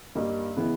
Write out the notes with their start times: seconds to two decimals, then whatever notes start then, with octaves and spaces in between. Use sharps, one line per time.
0.15 G2 G3 A#3 D#4
0.57 C#3 E3 G#3 B3 E4